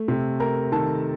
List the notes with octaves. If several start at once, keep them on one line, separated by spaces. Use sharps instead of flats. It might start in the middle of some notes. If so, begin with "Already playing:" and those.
Already playing: A3
C3
A3 A#4 A#5
D#3 A4 A5